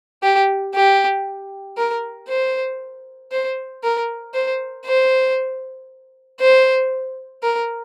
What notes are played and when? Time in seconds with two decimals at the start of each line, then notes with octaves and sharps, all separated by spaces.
0.23 G4
0.74 G4
1.77 A#4
2.28 C5
3.31 C5
3.83 A#4
4.34 C5
4.85 C5
6.40 C5
7.42 A#4